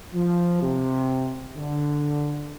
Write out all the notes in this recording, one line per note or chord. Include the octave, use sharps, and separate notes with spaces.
F3
C3
D3